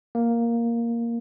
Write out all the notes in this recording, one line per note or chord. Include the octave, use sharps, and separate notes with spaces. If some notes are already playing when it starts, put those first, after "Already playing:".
A#3